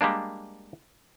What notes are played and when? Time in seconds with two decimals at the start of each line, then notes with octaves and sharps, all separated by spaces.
0.01 G3 G#3 A#3 D4